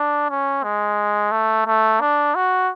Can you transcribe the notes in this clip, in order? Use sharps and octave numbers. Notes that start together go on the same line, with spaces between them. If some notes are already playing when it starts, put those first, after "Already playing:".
Already playing: D4
C#4
G#3
A3
A3
D4
F#4